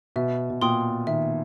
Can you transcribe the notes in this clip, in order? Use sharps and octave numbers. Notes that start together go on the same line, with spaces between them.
B2 E5
B2
A#2 G5 C6 D#6
D#3 E5